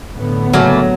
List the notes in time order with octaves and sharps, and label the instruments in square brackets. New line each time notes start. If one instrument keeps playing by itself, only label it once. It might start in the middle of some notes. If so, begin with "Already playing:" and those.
[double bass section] A2 D3 B3
[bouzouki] C#3 A3 A#3 [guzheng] F#3